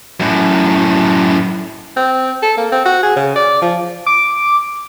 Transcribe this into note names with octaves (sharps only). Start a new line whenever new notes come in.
F#2 A2
C4
A4
A#3
C4
F#4
G#4
C#3
D5
F3
D6